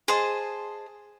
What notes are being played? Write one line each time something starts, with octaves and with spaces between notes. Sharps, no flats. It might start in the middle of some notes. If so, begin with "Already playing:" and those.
G#4 C5 D#5 A5